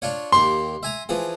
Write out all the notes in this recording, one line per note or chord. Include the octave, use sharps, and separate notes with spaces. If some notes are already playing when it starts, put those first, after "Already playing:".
D4 F4 C#5
D#2 A#3 G4 C6
E5 G#5 A#5
E3 F3 G#4